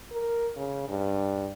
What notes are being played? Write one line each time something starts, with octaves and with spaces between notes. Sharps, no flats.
A#4
C#3
G2